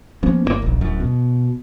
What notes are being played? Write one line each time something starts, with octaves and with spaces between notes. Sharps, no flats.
F3 A#3 B3 C#4
G1 D#3 A#3
D#1 A#1
D1 F#2
B2